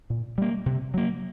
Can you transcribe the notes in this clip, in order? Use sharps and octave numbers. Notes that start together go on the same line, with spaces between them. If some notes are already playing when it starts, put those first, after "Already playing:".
A#2
G3 A#3
C3
F#3 A#3